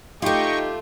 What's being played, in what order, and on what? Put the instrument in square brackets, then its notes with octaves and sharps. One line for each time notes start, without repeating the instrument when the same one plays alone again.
[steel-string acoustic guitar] A3 F4 [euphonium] D#4 [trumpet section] G4 [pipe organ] D#5 G5 C#6